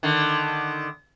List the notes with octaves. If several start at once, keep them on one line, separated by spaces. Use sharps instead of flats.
D3 D#3